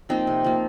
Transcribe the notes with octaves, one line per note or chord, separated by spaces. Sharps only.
F3 A#3 C4 D#4
C3
F3 A#3